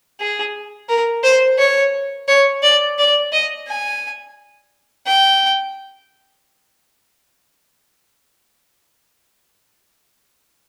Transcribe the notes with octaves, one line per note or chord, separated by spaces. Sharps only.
G#4
A#4
C5
C#5
C#5
D5
D5
D#5
G#5
G5